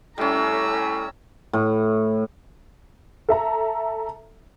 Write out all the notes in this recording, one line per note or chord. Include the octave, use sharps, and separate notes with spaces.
A2 G3 C#4 A4 A#5 E6
A2
A4 E5 A#5